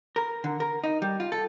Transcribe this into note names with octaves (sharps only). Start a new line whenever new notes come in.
A#4
D3
A#4
D#4
G3
F4
A4